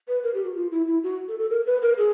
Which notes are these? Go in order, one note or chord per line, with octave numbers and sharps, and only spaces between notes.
B4
A#4
G4
F#4
F4
E4
E4
F#4
A4
A4
A#4
B4
A#4
G#4